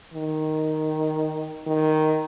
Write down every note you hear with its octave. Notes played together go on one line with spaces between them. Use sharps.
D#3
D#3